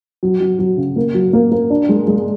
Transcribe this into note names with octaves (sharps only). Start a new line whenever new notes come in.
F#3
F#3
F#3
C#3
A#3
F#3
A#3
A#3
D4
G#3
G#3